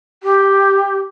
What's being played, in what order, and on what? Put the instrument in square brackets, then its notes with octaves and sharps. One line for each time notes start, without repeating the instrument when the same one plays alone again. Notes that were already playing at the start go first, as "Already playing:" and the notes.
[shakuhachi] G4